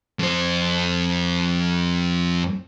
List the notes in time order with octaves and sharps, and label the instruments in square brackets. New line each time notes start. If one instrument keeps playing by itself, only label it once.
[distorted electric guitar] F2 C5